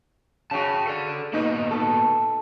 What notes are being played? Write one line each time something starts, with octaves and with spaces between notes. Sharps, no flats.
C#3 F#4 G5 A5
A4 D5
A#3 B3 D#4 F#4
A4